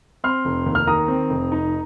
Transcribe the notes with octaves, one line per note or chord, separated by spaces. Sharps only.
C4 C6 F6
F1
D#2
F6
D#3 A#5 D#6
C4
F1
D#4